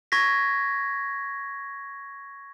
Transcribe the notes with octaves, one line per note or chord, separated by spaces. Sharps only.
C#6 G#6 A#6 B6